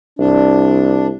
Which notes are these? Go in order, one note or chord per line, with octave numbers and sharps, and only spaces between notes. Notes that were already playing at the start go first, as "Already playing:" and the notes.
C2 D4